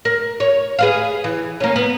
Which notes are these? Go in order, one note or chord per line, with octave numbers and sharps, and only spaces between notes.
A#4
C#5
G#4 B4 F5
E3
A#3 C#4
B3